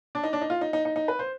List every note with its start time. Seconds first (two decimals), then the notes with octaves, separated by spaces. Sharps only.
0.15 D4
0.24 D#4
0.33 D4
0.41 D#4
0.50 F4
0.61 D#4
0.73 D#4
0.85 D#4
0.96 D#4
1.08 B4
1.19 C5